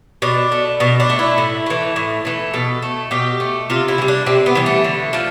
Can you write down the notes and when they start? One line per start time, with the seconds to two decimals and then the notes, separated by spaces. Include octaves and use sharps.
0.22 B2 D4
0.52 A3
0.80 B2 D4
1.00 D4
1.10 A3
1.19 E4
1.38 A2
1.66 E3 A3
1.96 A2
2.25 E3 A3
2.54 B2 A4
2.82 A3
3.11 B2 G4
3.40 A3
3.70 C3 F4
3.88 E4
3.98 E3
4.02 G3
4.08 D4
4.26 C3 C4
4.46 B3
4.55 E3 G3
4.66 A3
4.84 D3
5.13 F3 A3